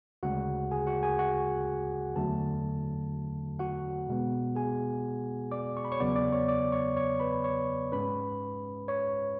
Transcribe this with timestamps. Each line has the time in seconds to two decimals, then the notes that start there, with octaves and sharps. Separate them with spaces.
0.23 D2 C#3 G#3 F#4 F#5
0.71 G#4 G#5
0.87 F#4 F#5
1.03 G#4 G#5
1.19 F#4 F#5
2.16 E2 D3 F#3 A3 A4 A5
3.59 F#4 F#5
4.08 B2 G#3 B3
4.56 G#4 G#5
5.52 D5 D6
5.77 C#6
5.85 B5
5.92 C#5 C#6
6.00 E2 C#3 F#3 B3 D5 D6
6.16 D5 D6
6.32 C#5 C#6
6.48 D5 D6
6.72 C#5 C#6
6.96 C#5 C#6
7.20 B4 B5
7.44 C#5 C#6
7.92 G#2 G#3 C#4 B4 B5
8.88 C#5 C#6